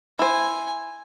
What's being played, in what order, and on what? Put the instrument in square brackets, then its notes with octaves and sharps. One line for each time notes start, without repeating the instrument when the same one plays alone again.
[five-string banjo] E4 C5 [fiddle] G#5